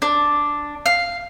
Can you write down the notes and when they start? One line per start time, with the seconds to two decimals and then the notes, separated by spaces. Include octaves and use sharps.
0.02 D4
0.86 F5